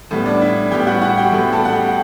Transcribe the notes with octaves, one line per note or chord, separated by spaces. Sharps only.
A2 G3 B3
D4 D5
E4 E5
A2 G3 B3 G4 G5
F#4 F#5
F#4 F#5
G4 G5
A2 G3 B3
A4 A5
F#5
G4 G5